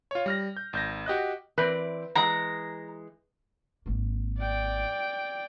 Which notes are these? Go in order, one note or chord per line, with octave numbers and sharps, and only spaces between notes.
F4 C#5
G3 F6 A#6
G6
G#1 G6 A#6
F#4 G4 D#5 F#6
E3 C4 B4 D5
E3 G#3 A#5
G#1 A#3
D5 G5